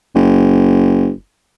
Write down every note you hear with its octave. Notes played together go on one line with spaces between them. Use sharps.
F#1